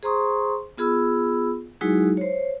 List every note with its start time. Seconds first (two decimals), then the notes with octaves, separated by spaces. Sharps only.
0.03 G#4 C5 A#5 C6 C#6 D#6
0.77 B3 F4 G#4 B5 E6
1.81 F#3 G#3 D#4 E4 F#4 G#4
2.17 C5 C#5